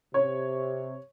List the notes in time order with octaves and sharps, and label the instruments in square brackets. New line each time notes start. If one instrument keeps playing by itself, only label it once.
[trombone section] C3 [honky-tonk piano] C#5